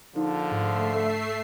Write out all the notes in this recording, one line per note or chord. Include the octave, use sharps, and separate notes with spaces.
A#1 D3 F3 D#4
G#2 A3 E5 C7
A4